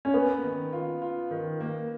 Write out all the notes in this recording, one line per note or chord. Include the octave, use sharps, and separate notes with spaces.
C#4
A#3 B3
D#3
F4
F4
D#3
A#3